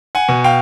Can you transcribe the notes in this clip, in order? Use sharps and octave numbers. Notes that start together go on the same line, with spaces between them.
F#5 G#5
B2
F5 G5